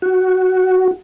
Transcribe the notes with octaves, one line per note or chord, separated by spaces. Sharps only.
F#4